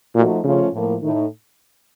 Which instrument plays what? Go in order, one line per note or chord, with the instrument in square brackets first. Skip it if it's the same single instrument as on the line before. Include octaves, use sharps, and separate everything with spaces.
[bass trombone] A#2 [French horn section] F3 A3 D#4 F#4
[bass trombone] C#3 [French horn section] F3 A3 C#4 F4
[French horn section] A2 F3 A#3
[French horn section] A2 A3 D#4 [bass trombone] D#3